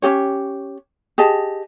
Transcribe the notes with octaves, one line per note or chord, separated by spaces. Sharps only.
C#4 D#4 G4 C#5
G4 G#4 D#5 A5